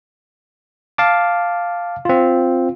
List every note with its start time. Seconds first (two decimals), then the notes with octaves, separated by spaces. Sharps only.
0.98 F5 A5 D6
2.05 C4 F4